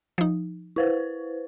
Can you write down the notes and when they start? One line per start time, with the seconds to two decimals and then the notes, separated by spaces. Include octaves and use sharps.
0.18 F3 D#4
0.76 E4 B4 C5